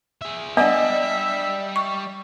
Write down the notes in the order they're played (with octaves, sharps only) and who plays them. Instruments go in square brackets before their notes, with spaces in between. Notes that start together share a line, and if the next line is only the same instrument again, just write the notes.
[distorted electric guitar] G#4 E5
[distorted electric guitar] G3 [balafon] B3 F#5 [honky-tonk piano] D4 D#5 [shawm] E5
[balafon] C#6